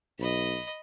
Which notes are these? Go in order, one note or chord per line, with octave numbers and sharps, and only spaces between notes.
B1 D#5 B5